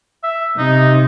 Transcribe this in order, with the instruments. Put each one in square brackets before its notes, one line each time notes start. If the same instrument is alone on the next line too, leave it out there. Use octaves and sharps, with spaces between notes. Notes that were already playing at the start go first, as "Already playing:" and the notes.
[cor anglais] E5
[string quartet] C3 [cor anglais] D#4